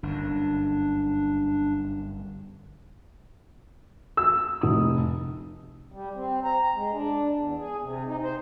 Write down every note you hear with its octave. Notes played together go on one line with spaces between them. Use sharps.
G1 F#2 D4
E6
F1 D#6
G3
C4
A#5
G#3
D4
E2
G#4
C3
D#4
C5